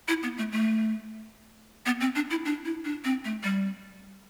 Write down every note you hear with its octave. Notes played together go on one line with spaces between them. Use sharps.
E4
B3
A3
A3
B3
C4
D4
E4
D4
E4
D4
C4
A3
G3